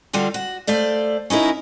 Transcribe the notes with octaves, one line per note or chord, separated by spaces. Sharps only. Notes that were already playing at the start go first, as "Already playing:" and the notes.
D3 G3 F4 F#4
F#4
A3 C5 D5 F5
C#4 D#4 E4 A#4